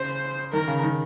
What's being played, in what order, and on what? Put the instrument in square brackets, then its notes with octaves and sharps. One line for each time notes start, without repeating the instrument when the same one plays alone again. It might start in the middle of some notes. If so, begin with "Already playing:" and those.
Already playing: [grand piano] C#3 [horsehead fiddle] C5
[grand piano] D#3 [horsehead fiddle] A#4
[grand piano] C#3
D#3